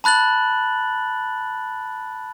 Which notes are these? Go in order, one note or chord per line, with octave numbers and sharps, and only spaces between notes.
A5 B5 F#6 A6 F#7